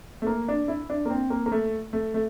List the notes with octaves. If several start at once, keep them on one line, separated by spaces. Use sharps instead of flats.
A3
A#3
D4
E4
D4
A#3
C4
A#3
A#3
A3
A3
A3